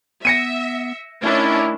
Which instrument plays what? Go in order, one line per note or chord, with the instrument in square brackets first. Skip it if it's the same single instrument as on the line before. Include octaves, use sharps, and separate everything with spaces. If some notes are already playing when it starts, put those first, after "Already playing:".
[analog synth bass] B3 [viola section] E5 [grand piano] A#6 C#7 D#7
[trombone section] D#3 E4 [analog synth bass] A3 [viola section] C#4 D4